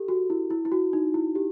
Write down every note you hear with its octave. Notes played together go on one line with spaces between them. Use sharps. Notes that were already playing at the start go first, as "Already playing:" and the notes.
Already playing: G4 A4
F#4
E4
E4
E4
F#4
D#4
E4
G4